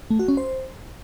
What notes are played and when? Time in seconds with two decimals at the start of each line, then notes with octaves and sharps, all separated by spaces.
0.10 A3
0.19 F#4
0.28 C#4
0.37 C5